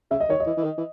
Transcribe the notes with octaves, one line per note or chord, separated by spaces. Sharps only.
C#3 E5
D#5
D#3 C#5
D#5
E3
E3
D#3
E3